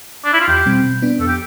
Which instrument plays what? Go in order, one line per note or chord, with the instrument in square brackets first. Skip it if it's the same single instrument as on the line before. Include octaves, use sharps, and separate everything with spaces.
[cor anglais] D4
E4
F4
[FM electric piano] E2 [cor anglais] G4
[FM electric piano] B2 G3 C4
B2
B3 D4
[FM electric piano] F2 [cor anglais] A4
[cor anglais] G4